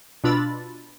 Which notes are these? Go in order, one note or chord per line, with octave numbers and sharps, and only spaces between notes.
B2 D4 F4 B5 E6 A6